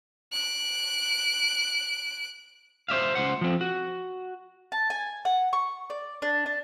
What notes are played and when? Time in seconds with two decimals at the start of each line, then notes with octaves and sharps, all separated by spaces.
0.32 F#6 D7
2.89 C5 D5 E5 F5
3.15 C#2 C5 F#5
3.41 F3 C4
3.61 F#4
4.72 A5
4.90 G#5
5.25 F#5
5.53 C#6
5.90 D5
6.22 D4
6.46 D4